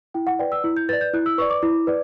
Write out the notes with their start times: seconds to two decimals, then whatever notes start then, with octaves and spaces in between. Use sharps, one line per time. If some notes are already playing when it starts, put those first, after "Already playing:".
0.14 E4 G5
0.27 F#5
0.39 B4 D5 G5
0.52 E6
0.64 E4
0.77 G6
0.89 B4 D5 A6
1.01 G6
1.13 E4 F#6
1.26 E6
1.38 B4 D5 C#6
1.50 D6
1.63 E4
1.87 B4 D5